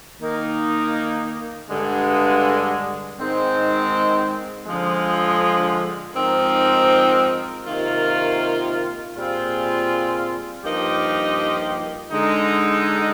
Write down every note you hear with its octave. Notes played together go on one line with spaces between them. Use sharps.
D#3 A#3 D#4
G2 D3 G#3
G#2 D#3 G#3 C4
D3 F3 G#3
G#2 F3 C4 D#4 A#4
C3 D#3 A#3 F4
A#2 G3 C4 F4 G#4
G2 F3 A#3 D#4 G4
D3 G#3 D#4